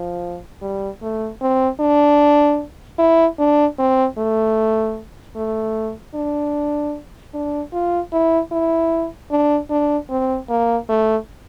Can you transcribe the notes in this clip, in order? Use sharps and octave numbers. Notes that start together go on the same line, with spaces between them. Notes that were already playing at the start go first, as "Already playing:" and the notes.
Already playing: F3
G3
A3
C4
D4
E4
D4
C4
A3
A3
D4
D4
F4
E4
E4
D4
D4
C4
A#3
A3